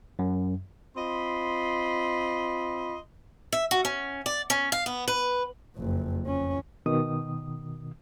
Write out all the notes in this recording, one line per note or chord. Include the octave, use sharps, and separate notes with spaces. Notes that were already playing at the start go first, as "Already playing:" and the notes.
F#2
C4 F4 D#5 B5 C6
E5
F#4
C#4
D5
C#4
F5
B3
B4
F#1 F2
F2 C#4
B2 D#3 D#6